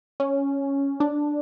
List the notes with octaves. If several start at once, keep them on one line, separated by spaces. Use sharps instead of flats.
C#4
D4